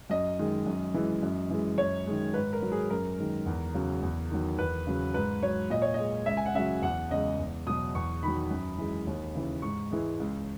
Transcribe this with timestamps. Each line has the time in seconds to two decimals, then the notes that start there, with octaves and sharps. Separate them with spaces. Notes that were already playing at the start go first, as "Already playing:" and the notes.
0.10 F#2 D#5
0.39 D#3 G#3
0.67 F#2
0.94 E3 G#3
1.23 F#2
1.50 E3 G#3
1.78 F#2 C#5
2.07 D#3 G#3
2.34 G#2 B4
2.53 A#4
2.62 F#3
2.72 G#4
2.90 F#2 A#4
3.19 D#3 G#3
3.46 E2
3.74 C#3 F#3
4.02 E2
4.31 D#3 F#3
4.58 E2 B4
4.87 C#3 F#3
5.14 G#2 B4
5.42 F#3 C#5
5.70 A#2 D#5
5.82 C#5
5.94 G#3 D#5
6.26 C#2 E5
6.37 G#5
6.46 F#5
6.54 C#3 F#3 E5
6.82 E2 F#5
7.11 C#3 G#3 D#5
7.39 E2
7.67 B2 F#3 D#6
7.95 E2 C#6
8.23 D#3 F#3 B5
8.51 F#2
8.78 E3 G#3
9.07 D#2
9.35 C#3 E3
9.62 G#2 C#6
9.91 E3 G#3
10.19 C#2